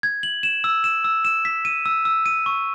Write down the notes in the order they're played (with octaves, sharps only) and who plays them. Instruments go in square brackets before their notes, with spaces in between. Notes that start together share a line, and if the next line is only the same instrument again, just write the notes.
[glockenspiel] G#6
F#7
E7
E6
E7
E6
E7
B6
D#7
E6
E6
D#7
C#6